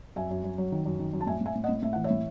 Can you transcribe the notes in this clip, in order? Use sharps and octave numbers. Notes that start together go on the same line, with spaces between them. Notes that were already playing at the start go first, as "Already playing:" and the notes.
F#2 E5 G#5
F#2
F#2
F#3
D#3
F#2
D#3
F#2
A5
A2 E5 G#5
A2 E5 G#5
A2
D#5 F#5
A2
A2 E5
E3 F#5
C#5 E5
A2